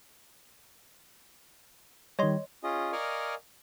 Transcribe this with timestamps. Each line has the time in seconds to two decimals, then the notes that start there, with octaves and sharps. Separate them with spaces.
2.19 D#3 G3 C#5 D#5 C6
2.64 C#4 F4 G#4 D#5
2.92 A#4 D5 D#5 F5 G#5 C#6